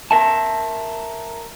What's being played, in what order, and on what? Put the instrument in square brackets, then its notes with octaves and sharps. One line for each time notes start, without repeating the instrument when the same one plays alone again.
[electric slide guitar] A#4 E5 A5